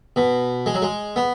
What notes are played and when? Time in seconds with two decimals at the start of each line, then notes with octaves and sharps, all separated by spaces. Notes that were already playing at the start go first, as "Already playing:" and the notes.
0.16 B2
0.66 G#3
0.74 F#3
0.82 G#3
1.16 B3